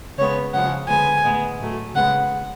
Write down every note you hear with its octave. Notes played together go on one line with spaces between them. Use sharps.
C#3 G#3 B3 C#5
C#3 F3 G#3 F#5
D3 G#3 B3 G#5
A2 G#3 B3
A2 F#3 A3
C#3 G#3 B3 F#5